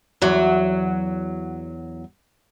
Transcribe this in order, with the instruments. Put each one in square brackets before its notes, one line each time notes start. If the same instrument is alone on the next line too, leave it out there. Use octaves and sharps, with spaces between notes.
[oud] E2 F#3